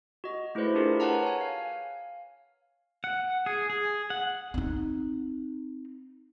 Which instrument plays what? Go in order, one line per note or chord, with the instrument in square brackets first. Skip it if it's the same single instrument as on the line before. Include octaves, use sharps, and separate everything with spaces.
[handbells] F#4 D#5
A3 E4 G#4 B4 C5 D5
D4 E4 F4 G4 G#4 A#4
B4 C#5 F#5 A5 A#5
C#5 G#5
F5
[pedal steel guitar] F#5
G#4
G#4
F#5
[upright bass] C4 D#4